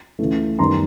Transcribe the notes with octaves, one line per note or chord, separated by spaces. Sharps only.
C#2 C#3 E3 A3
F#2 D#3 G3 B3 A#5 C6